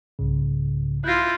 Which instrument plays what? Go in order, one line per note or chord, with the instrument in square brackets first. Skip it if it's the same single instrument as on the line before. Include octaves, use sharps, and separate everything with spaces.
[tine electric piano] C2 G#2 C#3
[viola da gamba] E4 F4 [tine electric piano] F#6 G6 A#6